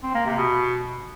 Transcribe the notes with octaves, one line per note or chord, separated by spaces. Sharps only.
C4
A#3
C3
B2